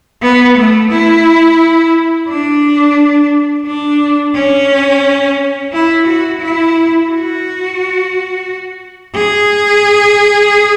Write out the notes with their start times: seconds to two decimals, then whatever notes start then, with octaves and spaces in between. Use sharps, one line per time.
0.22 B3
0.57 A3
0.91 E4
2.28 D4
3.66 D4
4.35 C#4
5.73 E4
6.06 F#4
6.40 E4
7.09 F#4
9.15 G#4